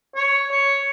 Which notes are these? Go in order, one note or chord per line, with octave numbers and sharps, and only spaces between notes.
C#5
C#5